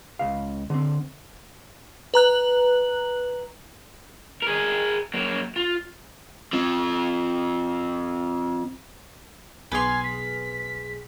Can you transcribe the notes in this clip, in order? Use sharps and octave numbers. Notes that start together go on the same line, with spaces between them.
C#2 F5
D3 C4
B4 A#5 F#6 F#7
G#4 A#4
F#3 A#3
F4
F3 C4
B1 G#4 B4 G#5 C6 F6
B6